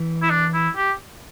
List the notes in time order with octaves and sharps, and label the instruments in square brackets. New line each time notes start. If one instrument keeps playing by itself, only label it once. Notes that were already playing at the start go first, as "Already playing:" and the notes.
Already playing: [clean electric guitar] E3
[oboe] E4
D4
E4
G4